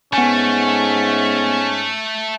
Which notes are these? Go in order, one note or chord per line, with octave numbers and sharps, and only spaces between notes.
G#2 A3 B3 C#4 G#5